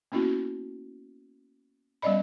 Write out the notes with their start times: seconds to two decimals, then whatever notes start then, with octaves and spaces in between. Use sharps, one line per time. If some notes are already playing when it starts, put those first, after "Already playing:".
0.12 A#3 B3 C#4 E4 F#4
2.02 G3 B3 C#4 D5 D#5 B5